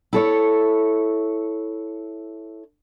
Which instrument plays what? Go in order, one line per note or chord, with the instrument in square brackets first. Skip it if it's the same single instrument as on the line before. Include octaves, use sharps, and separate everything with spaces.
[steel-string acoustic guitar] E4 A4 C#5